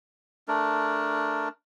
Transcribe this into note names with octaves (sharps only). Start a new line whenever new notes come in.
A3 D4 A#4